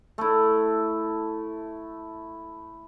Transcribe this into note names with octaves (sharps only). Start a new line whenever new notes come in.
A3 E4